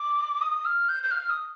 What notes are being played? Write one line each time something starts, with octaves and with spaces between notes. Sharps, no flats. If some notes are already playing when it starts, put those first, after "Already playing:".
Already playing: D6
D#6
F6
G6
G6
F6
D#6